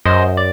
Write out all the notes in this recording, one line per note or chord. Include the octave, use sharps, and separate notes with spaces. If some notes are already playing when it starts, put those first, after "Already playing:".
F#2 C5 D#5
D5